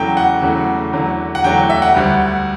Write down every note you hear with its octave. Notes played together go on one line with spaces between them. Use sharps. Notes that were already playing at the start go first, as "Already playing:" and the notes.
Already playing: E2 C#3 F#3 A3 G5
F#5
E2 C#3 F#3 A3
E2 D3 F#3 A3
F#5
E2 D3 F#3 A3 G5
E5
F#5
D2 D3 G3